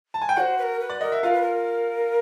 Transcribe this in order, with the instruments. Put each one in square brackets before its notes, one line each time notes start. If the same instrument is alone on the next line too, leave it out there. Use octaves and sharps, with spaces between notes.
[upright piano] A5
G#5
G5
[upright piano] F#4 F#5 [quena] C5 D5
[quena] B4
A#4
B4
[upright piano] D5
[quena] A#4 [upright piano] D#5
[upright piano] E5
[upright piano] F4 F5 [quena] A#4
[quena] B4
A#4